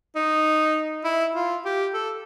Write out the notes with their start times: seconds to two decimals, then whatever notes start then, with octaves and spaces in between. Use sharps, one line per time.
0.16 D#4
1.04 E4
1.35 F4
1.65 G4
1.94 A4